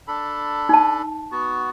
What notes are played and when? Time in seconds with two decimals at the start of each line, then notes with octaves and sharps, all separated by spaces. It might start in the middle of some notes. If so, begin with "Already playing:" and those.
0.08 D4 A4 B5
0.69 D#4 A5
1.31 B3 F#4